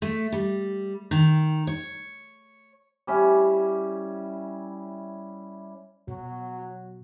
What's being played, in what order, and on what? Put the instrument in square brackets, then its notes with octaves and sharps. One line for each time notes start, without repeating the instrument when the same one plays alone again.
[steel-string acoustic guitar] A3
G3
D#3
C#5
[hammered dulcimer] G3 C#4 E4
[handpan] B2 [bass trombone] F#3